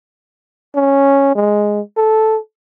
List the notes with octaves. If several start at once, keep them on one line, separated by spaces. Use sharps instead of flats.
C#4
G#3
A4